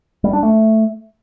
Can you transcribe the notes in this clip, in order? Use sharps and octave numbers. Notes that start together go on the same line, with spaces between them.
G3
D4
A3